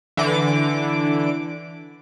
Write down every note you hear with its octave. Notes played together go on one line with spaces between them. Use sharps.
D3 E3 D6